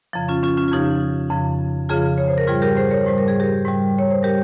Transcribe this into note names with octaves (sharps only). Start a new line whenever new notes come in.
F2 C#3 F3
C#4 F4
C#4 F4
C#4 F4
F4
F2 C#3 F3 D#4 G4
F2 C#3 F3
F2 C#3 F3 F4 G#4
C#5
C5
A#4
G#2 G3 F4 G#4
G4 A#4
G#4 C5
A#4 C#5
G#2 G3 C5
A#4
G#4
G4 A#4
G#2 G3
C#5
C5
G3 G4 A#4